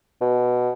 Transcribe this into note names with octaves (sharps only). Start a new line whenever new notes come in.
B2